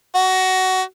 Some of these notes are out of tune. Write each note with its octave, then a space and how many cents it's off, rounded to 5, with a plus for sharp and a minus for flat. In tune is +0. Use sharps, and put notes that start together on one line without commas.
F#4 +20